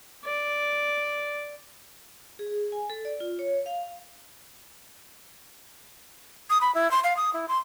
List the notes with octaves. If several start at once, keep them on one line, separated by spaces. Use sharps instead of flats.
D5
G#4
G#5
A4
D5
F4
C#5
F5
D#6
B5
E4
C6
F5
D#6
E4
C6